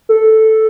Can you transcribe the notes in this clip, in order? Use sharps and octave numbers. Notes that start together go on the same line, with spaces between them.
A4